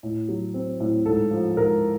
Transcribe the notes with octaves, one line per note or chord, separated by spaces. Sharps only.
A2
F#3
C4
A2
G#2 A4
F3
G#2 A#4